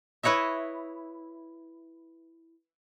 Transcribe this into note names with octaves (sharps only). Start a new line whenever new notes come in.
E4 B4 C#5 D#5 E5